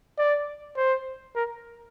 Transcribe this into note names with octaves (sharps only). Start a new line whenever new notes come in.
D5
C5
A#4